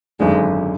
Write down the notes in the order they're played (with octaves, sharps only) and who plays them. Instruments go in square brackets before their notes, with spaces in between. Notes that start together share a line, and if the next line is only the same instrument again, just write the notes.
[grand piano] G#1 F#2 D3 [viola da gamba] G#3